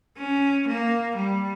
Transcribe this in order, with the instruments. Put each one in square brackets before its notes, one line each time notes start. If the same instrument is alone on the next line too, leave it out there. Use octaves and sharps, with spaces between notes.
[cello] C#4
A#3
G3